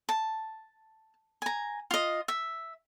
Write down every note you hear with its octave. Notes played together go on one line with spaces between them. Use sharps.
A5
G#5 A#5
F4 D#5
E5